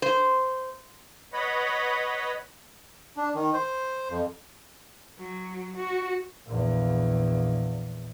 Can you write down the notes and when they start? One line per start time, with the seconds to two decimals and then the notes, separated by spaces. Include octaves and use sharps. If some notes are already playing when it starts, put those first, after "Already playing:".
0.02 C5
1.33 B4 C#5 D#5 F#5 B5
3.17 D4
3.35 D#3
3.54 C5
4.09 F2
5.19 F#3
5.76 F#4
6.46 A#1 E2